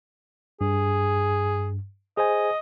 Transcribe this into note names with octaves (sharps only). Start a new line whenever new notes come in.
G2 G#4
G#4 C5 D#5 G#5